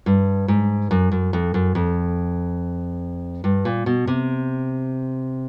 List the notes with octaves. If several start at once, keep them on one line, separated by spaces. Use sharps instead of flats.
G2
G#2
F#2
F#2
F2
F#2
F2
G2
A#2
B2
C3